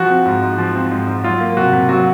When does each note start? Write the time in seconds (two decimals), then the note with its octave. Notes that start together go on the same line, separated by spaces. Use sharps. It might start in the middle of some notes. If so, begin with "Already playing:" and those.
Already playing: F3 F#4
0.10 C4
0.25 G#2
0.42 G#2
0.58 F3
0.75 C4
0.92 G#2
1.07 G#2
1.24 F#3 F4
1.40 A#3
1.57 C3 F#4
1.73 C3
1.89 F#3 F#4